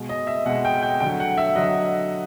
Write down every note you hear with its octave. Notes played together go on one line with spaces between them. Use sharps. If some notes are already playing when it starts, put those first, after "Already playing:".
Already playing: B2 G#3
D#5
E5
B2 G#3 F#5
G5
G5
D3 F#3 G5
F#5
E5
D3 F#3 D#5